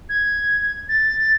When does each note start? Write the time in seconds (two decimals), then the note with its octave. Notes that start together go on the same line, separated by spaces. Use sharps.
0.09 G#6
0.89 A6